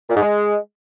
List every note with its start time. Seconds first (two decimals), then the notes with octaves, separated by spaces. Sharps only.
0.10 A#2
0.15 G#2
0.21 G#3